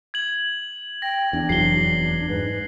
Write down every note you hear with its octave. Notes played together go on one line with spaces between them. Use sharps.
G#6 F#7
G5 A#6
E2 D4
F1 E2 F#3 C7 G7
G#2 B4